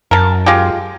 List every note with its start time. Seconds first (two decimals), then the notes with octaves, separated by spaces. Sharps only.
0.11 F#2 A#4 A5
0.46 G#3 F4 G4